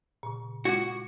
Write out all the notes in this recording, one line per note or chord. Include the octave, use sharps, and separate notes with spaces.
A#2 C#3
G#3 F4 F#4